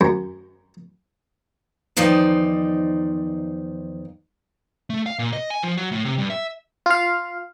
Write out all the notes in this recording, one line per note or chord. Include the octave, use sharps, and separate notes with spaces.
F#2
E2 D#3 F3 D#4 C5 D5
A3
F5
A#2
D#5
G#5
F3
F#3
A2
C3
G2
E5
F4 F5